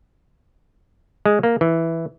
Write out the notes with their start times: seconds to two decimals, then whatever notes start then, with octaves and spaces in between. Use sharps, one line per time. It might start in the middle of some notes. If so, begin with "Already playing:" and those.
1.26 G#3
1.43 A#3
1.61 E3